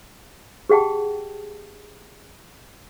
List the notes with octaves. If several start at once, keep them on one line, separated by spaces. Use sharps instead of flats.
G4 G#4 F#5 G5 A5